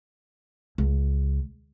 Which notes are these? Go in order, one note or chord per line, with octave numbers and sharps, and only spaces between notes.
C#2